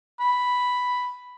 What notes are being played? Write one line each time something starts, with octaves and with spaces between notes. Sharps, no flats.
B5